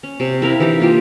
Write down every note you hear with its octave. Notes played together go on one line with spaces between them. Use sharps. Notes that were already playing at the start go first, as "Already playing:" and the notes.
C#4
C3
E4 A#4 F5 B5
E3 D4 D#4 G4
A#3 F4 G4